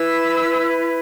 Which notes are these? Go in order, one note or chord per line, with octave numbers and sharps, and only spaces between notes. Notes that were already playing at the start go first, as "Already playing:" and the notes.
Already playing: E4 B4 E6